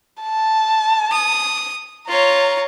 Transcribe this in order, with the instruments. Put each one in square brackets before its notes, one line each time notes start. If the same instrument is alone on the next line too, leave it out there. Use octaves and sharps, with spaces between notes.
[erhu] A5
[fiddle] D#6
[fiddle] F4 C#5 [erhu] A#5